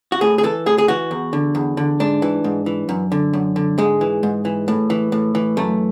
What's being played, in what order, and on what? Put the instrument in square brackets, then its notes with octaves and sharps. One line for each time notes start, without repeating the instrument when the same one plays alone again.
[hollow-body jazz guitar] F#4
A2 G#4
G#4
E3 A4
A2 G#4
G#4
E3 F#4
E2
D3
E2
D3
G#2 D4
E3
G#2
E3
F#2
D3
F#2
D3
G#2 G#3
E3
G#2
E3
A2
E3
A2
E3
F#2 A3